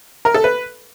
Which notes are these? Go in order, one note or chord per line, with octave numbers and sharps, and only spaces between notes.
A#4
A4
B4